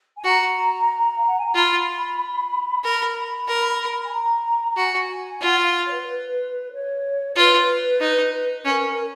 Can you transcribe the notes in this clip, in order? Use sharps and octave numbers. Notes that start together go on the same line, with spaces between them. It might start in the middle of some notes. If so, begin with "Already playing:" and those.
G#5
F#4 A#5
F5
F#5
G#5
A#5
F4 B5
A#4 B5
B5
A#4
G#5
A#5
A#5
F#4 G#5
F4 F#5
F5
C#5
B4
B4
C#5
F4 B4
D#4
C#4 A#4